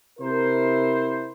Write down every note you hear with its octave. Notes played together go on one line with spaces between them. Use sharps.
C3 E4 A#4 C5